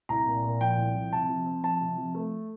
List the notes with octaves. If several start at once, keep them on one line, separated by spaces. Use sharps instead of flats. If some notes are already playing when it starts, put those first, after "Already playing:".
C2 A#5
A#2
A#2
F3 G5
C2
F3
C3 A5
F3
C4
F3 A5
C3
F3
A3